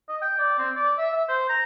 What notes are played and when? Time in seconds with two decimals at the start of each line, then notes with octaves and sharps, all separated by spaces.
0.09 D#5
0.22 G5
0.39 D5
0.58 C4
0.76 D5
0.98 E5
1.13 E5
1.29 C5
1.49 A#5